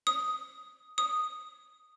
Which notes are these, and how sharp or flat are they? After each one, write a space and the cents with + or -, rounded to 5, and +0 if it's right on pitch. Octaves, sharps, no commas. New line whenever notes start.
D#6 +5
D#6 -5